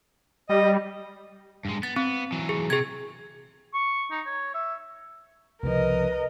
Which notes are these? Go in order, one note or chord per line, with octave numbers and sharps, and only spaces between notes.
G3 D#5
G2 G#3
B3 A6
B3 C4
E3 F#3
G#4
C3 G#4 G#6
C#6
D#4
C#5
E5
C2 C#3 F3 A#4 B4 D#5